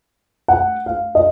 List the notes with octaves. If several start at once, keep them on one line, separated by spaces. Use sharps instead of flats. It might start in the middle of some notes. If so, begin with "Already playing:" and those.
F#5
F5
D#5